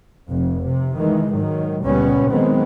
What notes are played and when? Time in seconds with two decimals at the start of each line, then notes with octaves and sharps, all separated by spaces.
0.29 F1 F2
0.64 C3
0.99 D#3 E3 G#3
1.36 G#2 D#3 F#3
1.83 C#2 A#2 G3 B3 C#4
2.30 D#3 F#3 G#3 B3 C4